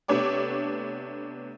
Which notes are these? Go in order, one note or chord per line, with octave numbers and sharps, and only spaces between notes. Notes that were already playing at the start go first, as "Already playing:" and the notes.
C3 A3 B3 D4 C#5 D6